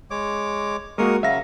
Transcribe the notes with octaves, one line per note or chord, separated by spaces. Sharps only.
G#3 C#5 D6
G#3 A#3 F#4 A#4 C#6 D#6
C#3 F#3 E5 F5 A#6